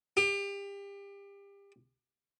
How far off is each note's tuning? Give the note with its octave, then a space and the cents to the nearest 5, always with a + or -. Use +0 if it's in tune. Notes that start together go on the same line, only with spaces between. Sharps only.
G4 +30